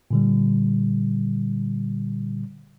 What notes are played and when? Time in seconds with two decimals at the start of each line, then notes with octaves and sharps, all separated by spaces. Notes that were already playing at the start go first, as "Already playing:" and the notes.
0.11 A#2 D3 G3